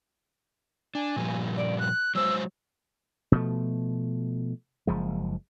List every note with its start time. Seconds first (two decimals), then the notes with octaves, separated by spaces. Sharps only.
0.95 D4 G#5
1.16 A#2 F3 G3
1.57 D5
1.79 F#6
2.15 F#3 G#3 C5 E6
3.32 B2 F3 A3
4.87 F#1 F3 G#3